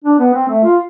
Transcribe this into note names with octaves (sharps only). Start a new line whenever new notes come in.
D4
B3
C4
A3
F4